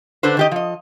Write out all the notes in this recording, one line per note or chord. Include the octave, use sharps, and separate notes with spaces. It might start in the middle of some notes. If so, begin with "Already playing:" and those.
D3 D4 A4 B4 C5
D#3 G4 D#5
F3 D#5